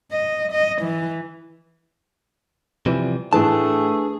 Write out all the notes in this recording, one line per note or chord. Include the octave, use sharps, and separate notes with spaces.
D#5
D#5
E3
C3 E3 F3 G3
A2 E3 A3 D4 G#4 B4 A5